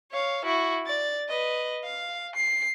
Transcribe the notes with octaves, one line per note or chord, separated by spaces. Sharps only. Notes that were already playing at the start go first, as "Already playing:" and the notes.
C#5 F5
E4 F#4
D5 A6
B4 D#5
F5
C7